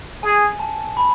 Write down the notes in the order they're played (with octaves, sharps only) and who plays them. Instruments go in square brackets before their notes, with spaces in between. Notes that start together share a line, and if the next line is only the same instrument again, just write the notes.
[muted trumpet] G#4 [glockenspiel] G#5
[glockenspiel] A5
B5